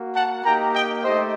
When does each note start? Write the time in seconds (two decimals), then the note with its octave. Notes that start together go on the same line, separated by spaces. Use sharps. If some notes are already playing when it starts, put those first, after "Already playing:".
Already playing: A#3 F#4
0.15 F#5 A5
0.44 A#3 D#4 G4 G5 A#5
0.74 D#5 G5
1.03 A3 D#4 G4 C5 D#5